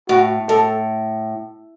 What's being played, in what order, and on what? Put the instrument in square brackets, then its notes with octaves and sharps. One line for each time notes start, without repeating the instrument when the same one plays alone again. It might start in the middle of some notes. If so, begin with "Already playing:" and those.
[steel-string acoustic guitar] A2 [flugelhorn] F#4
[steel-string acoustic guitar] A2 [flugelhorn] A4